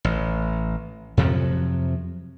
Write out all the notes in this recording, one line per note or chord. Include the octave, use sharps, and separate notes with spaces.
A1
F2 C3 F3 F#3